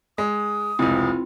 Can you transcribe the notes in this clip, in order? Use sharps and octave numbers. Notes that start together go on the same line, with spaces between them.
G#3 D#6
F1 C#2 C4 E4 F4